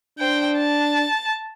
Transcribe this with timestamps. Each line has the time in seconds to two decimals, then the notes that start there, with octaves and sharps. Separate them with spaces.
0.19 D4 C5 G5
0.57 A5